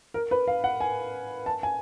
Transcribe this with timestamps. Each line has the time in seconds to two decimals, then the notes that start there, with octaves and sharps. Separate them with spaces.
0.14 A#4
0.31 B4
0.48 F5
0.64 F#5
0.81 G#5
1.46 A5
1.63 G#5